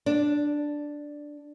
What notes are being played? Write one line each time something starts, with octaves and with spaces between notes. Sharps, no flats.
D4